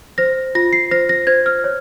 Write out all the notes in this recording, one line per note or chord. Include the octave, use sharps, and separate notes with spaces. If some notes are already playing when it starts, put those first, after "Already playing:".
C5 A#6
F4 A#6
C7
C5 A#6
A#6
C5 G#6
F6
C#5